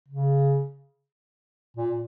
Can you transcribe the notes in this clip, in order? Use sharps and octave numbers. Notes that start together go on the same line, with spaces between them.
C#3
A#2